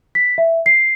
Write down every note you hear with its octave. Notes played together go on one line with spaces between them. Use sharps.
B6
E5
C7